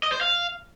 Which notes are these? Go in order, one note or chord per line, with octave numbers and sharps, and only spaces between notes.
D#5
C5
F5